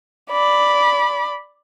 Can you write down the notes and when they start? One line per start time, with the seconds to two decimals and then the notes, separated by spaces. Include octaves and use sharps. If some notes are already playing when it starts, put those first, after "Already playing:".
0.32 D5 B5